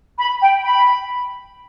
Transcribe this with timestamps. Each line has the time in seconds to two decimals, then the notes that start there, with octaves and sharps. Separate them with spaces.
0.18 B5
0.41 G5
0.64 B5